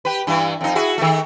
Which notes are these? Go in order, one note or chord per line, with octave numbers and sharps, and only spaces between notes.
G4 B4
G2 E3
F2 D#4
E4 F#4 G#4
D#3 A3